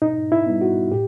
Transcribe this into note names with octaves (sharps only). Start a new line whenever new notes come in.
B2 D#4
E4
G3 B3
F#4
A2 G4